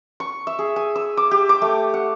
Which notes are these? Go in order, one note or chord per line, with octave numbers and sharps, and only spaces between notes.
C#6
E5
G#4
G#5
E6
D6
G4
D6
A3
F#5